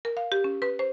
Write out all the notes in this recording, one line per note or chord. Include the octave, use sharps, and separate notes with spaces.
A#4
F5
G4
C#4
B4
C5